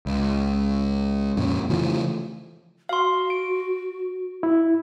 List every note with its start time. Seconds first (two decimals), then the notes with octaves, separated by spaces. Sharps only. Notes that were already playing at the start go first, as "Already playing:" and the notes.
0.06 C#2
1.37 F2 A#2 C#4
1.70 C#3 E3 F3 A3
2.89 F#4 F5 C6
3.30 D7
4.43 E4